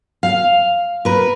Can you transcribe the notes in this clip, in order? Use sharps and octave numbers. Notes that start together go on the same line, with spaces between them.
F5
A#4 B4